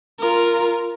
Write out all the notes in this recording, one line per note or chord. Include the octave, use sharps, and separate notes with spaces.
F4 A#4